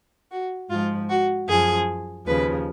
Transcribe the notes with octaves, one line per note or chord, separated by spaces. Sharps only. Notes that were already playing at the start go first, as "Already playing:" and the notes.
F#4
G#2 F3 F4
F#4
F#2 F3 G#4
D#2 C#3 F3 B4